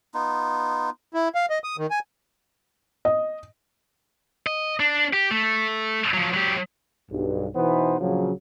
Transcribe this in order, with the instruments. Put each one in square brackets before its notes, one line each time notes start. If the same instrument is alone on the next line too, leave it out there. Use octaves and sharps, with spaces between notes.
[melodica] B3 D#4 F4
[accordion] E4
F5
D#5
D#6
D#3
G#5
[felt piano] D#5
[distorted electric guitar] D#5
D4
G4
A3
F3 F#3
F#3 G4
[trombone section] B1 G2
B2 E3 B3 D#4 B4 C5
A#1 C#3 F3 F#3